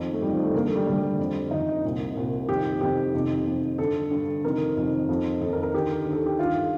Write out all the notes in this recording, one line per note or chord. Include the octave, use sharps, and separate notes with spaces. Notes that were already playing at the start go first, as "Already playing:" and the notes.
Already playing: F2 D#3
A3
F2 D#3 G3
F3
A3
D2 D3 A#3
A3
G3
D2 D3 G3
F2 D3
F2 D3 D#4
C2 A#2
C2 A#2
F2 C3 D#3 G4
F2 C3 D#3 G4
F2 C3 D#3
F2 C3 D#3
G2 D3 A4
G2 D3
F2 C3 D#3 A#4
F2 C3 D#3
F2 D#3
F2 D#3 A4
A#4
A#4
D#2 D3 G4
D#2 D3
A4
G4
G2 D#3 F4